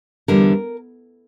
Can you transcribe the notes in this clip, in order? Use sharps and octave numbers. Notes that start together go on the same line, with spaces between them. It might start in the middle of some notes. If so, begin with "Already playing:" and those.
E2 D3 G3 A#4